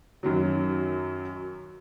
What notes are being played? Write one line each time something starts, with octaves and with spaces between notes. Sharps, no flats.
F#2 D#3 F#3